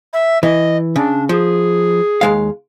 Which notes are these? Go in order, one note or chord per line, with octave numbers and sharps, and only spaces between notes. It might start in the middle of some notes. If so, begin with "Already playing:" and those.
E5
E3 D#5
C#3 D4
F3 G#4
D#2 G#3 F5